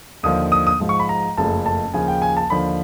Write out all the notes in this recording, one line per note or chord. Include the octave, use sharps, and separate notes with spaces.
D#2 D3 F3 D#6
D#6
D#6
G#2 F3 G#3
C#6
B5
A#5
F#1 F2 C#3 F3 A3 A5
A5
D#2 C#3 F3 G#5
G5
G#5
A5
D#2 D3 F3 B5